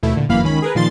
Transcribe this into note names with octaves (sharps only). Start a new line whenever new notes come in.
D#2 B2 A3 E4
A#2 D3
G1 F#2 E3 A#3 F5 B5
C#2 D#3 C#4 B5
G#4 A#4 B4
A#2 D#3 F3 C6 A6